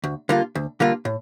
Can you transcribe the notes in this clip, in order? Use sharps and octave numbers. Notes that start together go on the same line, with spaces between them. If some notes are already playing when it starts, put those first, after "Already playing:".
D2
D3 G3 A#3 F4
D2
D3 G3 A#3 F4
A2